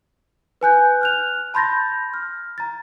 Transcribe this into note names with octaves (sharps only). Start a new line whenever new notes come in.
B4 G#5 F#6 G6
F6 F#6 F7
A5 B5 C6 G6 A6 A#6
F6
A#5 A6